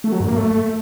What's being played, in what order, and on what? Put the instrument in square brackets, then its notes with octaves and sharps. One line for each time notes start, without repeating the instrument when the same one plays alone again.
[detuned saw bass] A3
F#3
G2
A#3
A3